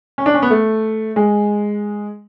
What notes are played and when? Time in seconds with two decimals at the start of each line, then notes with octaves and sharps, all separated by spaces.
0.18 C#4
0.26 D4
0.35 C#4
0.42 B3
0.50 A3
1.16 G#3